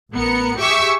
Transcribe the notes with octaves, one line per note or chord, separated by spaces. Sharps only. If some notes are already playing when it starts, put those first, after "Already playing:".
A1 B3 A#4 C#7
G4 G#4 E5 C#6 D6 E6